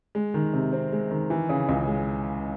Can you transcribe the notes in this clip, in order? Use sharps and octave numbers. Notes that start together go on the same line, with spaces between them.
G#3
D#3
C3
C4
G#3
D#3
E3
C#3
C#2
G#3